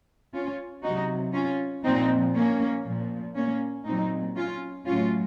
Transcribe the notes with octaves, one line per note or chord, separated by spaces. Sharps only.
C#4 F4
C3 F#3 D#4 F#4
C#4 F4
A#2 F3 C4 D#4
A#3 C#4
A#2 F3
A#3 C#4
A#2 F#3 C4 D#4
C#4 F4
A2 F#3 C#4 F4